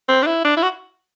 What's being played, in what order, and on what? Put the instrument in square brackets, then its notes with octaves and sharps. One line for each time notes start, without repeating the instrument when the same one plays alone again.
[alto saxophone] C4
D4
E4
D4
E4
F#4